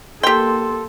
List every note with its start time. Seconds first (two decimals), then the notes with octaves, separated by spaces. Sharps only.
0.23 A#3 G4 A4 G5 C6